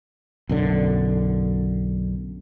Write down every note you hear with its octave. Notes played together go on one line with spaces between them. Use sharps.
B1 F#2 D3